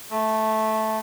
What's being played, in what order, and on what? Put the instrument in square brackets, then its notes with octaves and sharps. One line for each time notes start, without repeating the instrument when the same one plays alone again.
[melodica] A3